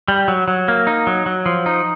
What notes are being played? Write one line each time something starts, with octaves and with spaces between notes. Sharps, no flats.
G3
F#3
F#3
A#3
D#4
F#3
F#3
F3
D#4